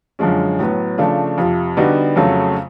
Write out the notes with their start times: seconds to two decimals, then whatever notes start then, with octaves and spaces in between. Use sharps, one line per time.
0.19 F#2 D3 F3 G#3 C#4
0.59 A2 F#3 B3
0.98 C#3 F3 A3 D4
1.38 F2 C3 F3
1.77 D3 G3 B3 D#4 F#4
2.16 F2 C#3 F#3 A3